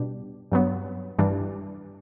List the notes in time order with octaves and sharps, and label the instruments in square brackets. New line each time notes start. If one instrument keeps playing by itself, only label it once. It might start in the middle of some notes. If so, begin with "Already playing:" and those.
Already playing: [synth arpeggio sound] B2 G3 D4 G4
G2 F#3 B3
G2 E3 G3 D4